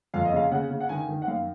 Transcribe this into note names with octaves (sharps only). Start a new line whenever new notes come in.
F2 F5
D#5
C#3 F5
C#3 F#5
C#3
F#5
D#3 G#5
D#3
F#5
F#2 F5